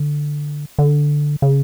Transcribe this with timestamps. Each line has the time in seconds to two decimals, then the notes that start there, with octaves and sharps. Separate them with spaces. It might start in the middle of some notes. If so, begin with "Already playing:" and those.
Already playing: D3
0.79 D3
1.42 C#3